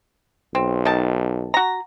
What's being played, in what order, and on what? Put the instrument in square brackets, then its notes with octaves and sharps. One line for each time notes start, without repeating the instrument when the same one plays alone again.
[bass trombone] B1 [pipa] C4
[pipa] D#3 A5
F#4 A#5